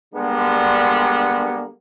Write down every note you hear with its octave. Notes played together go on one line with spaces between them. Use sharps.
D3 G3 G#3 A#3 B3 D4